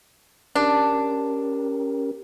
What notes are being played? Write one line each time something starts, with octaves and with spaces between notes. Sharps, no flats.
C#4 D4 G4 A#4